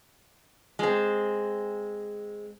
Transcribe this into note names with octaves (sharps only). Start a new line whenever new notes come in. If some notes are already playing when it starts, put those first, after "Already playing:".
G#3 C4